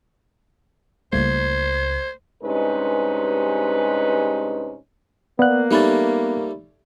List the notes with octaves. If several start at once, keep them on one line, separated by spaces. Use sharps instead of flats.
C#2 G3 A3 A#3 E4 C5 G#6
G2 C3 G#3 C#4 D#4 B4
A#3 B3 D5 F5 F#5 F#6
G3 A3 C#4 D#4 B5 A6